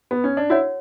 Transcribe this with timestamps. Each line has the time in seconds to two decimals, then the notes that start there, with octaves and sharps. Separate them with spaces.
0.11 B3
0.24 C#4
0.37 D4
0.50 E4 F#4 C#5 F#5